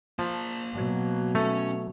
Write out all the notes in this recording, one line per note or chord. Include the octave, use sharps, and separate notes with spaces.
F3 A#3 A5
B2 F#3
A3 C#4